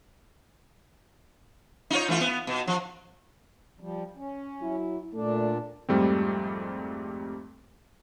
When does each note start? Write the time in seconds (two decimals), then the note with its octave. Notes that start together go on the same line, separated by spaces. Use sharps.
1.90 D#4 F4 C#5
2.08 E3 A3 F4
2.21 B3
2.47 B2
2.67 F3
3.80 F3 G3
4.17 C#4
4.62 F#3 E4
5.14 A#2 A3 D4
5.89 F2 G#2 G3 A3 C4